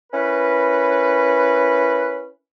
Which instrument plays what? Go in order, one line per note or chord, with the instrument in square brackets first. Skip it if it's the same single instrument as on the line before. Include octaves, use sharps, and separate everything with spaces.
[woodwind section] C#4 E4 A#4 B4